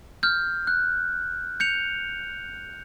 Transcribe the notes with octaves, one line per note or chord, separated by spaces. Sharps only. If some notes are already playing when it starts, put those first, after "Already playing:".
F6 G6
F#6
G6 C#7 F7